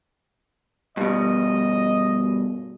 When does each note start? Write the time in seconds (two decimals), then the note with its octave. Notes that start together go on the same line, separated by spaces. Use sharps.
0.97 G2 B2 D#5